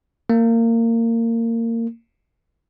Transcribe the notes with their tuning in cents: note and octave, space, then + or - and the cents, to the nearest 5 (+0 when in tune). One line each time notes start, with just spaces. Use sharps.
A#3 -25